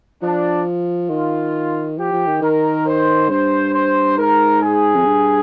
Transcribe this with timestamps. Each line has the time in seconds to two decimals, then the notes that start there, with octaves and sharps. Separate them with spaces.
0.22 F3 D4
1.09 D#3 F4
1.98 F3 G4
2.13 F3
2.27 D#3
2.42 D#3 A#4
2.86 C5
3.29 G2 C5
3.73 C5
4.17 G#2 A#4
4.62 G#4
4.95 F2
5.06 G2